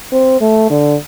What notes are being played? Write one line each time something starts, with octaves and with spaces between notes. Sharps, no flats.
C4
A3
D3